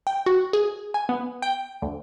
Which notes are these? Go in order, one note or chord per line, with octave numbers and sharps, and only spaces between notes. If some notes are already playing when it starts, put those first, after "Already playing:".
G5
F#4
G#4
G#5
B3
G5
D2